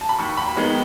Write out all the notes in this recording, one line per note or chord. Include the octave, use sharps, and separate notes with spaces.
A5
B5
D#2 C#6
B5
D#3 G#3 B3 B5